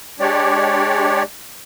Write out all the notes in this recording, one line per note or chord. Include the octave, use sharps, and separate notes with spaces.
G#3 D4 G4 C#5 D5